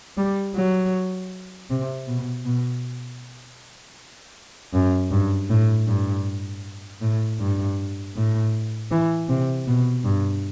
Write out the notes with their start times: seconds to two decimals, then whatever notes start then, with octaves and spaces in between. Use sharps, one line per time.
0.17 G3
0.55 F#3
1.70 C3
2.07 B2
2.45 B2
4.74 F#2
5.11 G2
5.49 A2
5.87 G2
7.01 A2
7.40 G2
8.15 A2
8.91 E3
9.29 C3
9.67 B2
10.04 G2